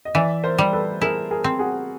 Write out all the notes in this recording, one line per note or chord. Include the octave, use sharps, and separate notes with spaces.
D#5
E3 D5 E5
A#4 C5
G3
A4 B4
E4 G#4 A#4
G#4 A#4
C4
F#4 G#4